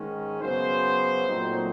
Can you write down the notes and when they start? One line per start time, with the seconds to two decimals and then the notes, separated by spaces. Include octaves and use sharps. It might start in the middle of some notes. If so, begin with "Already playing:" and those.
Already playing: G#2 D#3 G#3 C#4
0.41 F#2 C#3 F#3 B3 C5
1.28 A#2 F#3 A3 C4 D#4